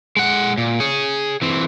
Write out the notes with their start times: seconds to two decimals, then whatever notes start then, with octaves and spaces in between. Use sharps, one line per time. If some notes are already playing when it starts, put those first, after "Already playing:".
0.17 G#3 F#5
0.58 A#2
0.80 G#4 C#5
1.42 E3 C4